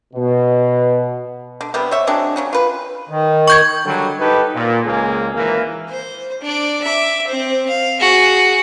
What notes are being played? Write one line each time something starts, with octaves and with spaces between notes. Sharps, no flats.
B2
D3
C3 G3 B3
C5 C#5 E5
F#3 G#3 C4 D4
C#3 F#3 C#4
F4 B4
D#3
C#6 G6 G#6
D3 F#3 G3
D#4 G4 A4 B4
A#2
C#2 G#3 A#3 G#4
G#1 E3 A#3
C5
D4 D5
E5 D6
C4 C5
F5
F#4 G#4